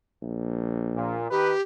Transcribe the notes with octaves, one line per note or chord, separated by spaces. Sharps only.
A#1
A#2
D#3 G4 B4